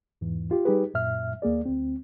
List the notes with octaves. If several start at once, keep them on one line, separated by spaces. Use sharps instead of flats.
E2 G#2 E3
F4 G4
G3 D#4 G4 G#4 B4
F#2 A#2 E5 F6
D#2 A#3 G#4 D5
D2 C4